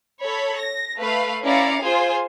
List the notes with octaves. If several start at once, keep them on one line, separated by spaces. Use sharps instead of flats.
A4 C#5 B5
A#6
A3 B4 F5
C#4 E4 D5 F5 A#5 C#7
F4 G#4 C5 G#5